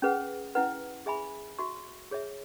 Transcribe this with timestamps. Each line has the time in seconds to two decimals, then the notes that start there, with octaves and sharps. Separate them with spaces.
0.02 C#4 G#4 B4 F#5
0.55 C#4 E4 B4 F#5
1.06 G#4 E5 G#5 B5
1.59 F#4 E5 C#6
2.11 G#4 C#5 E5